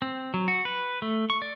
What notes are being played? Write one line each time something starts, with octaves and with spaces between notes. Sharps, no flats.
C4
F#3
F#4
B4
A3
C#6
D5